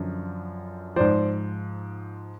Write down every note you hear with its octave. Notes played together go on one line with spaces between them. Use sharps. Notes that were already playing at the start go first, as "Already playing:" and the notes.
Already playing: F#2 D3 F3
G#2 F3 C5 D5